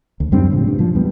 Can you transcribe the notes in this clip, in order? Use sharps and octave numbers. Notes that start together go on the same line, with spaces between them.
D2
F#2 G3 C4 D4
A2 C#3 E3 F3
G2 G3
A#2 F3
E2 G3 B3